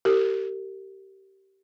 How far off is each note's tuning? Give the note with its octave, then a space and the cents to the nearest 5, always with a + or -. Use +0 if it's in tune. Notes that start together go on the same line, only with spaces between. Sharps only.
G4 -20 A#4 -40